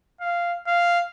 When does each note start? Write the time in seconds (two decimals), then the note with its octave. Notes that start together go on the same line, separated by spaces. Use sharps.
0.21 F5
0.67 F5